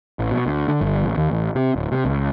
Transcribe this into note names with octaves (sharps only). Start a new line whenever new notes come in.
A1
B2
D2
D3
G1
A1
D#2
A1
C3
D1
C3
C#2